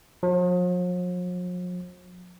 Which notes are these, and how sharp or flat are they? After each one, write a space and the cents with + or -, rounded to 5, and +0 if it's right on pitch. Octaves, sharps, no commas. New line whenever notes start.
F3 +45